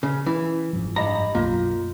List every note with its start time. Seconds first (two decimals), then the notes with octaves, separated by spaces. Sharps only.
0.03 C#3
0.26 E3 C#4
0.73 F#1 G#2 F3
0.96 G2 D#5 A#5 B5
1.35 B1 F#2 A#3 F4